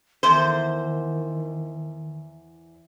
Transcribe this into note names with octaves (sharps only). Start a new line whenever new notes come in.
E2 D#3 C5